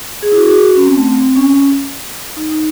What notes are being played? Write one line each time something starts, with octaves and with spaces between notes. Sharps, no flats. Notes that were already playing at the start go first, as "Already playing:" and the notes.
G#4
E4
F#4
G#4
F#4
F#4
C#4
C4
A3
C4
C4
C#4
D#4
D#4